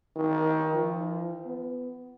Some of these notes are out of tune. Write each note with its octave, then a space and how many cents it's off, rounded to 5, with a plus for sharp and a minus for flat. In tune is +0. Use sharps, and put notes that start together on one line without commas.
D#3 +20
F3 -35
B3 +20